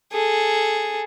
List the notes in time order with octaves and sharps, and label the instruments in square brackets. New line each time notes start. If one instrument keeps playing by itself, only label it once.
[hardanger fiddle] G#4 A4